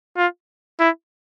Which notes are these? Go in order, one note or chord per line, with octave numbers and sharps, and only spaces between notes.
F4
E4